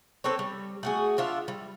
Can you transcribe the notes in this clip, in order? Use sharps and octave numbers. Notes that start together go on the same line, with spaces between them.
C4 A4 B4 C#5
G3
A3 F#4 G#4
D4 F4 E5
G3